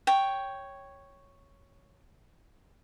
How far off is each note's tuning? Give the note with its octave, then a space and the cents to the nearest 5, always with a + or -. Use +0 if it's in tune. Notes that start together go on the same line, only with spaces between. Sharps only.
C#5 +0 G5 +0